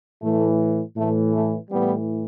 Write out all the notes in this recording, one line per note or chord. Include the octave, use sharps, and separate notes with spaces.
A2 E3 A3
A2 E3 A3
A3
A2 E3 G3 B3